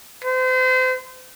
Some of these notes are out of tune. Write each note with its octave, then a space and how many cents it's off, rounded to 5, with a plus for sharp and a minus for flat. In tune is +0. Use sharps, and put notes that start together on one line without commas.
C5 -35